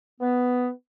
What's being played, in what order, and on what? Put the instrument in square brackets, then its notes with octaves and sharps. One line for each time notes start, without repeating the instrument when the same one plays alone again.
[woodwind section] B3